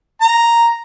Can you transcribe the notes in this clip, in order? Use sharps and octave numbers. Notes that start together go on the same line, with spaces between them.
A#5